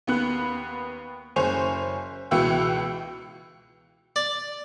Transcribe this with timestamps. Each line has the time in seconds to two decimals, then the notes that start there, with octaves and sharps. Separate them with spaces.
0.07 D#2 B3 F#6
1.36 F#1 C#4 C5 G#5 C#6 F7
2.31 C#2 B2 E3 G5 E6
4.16 D5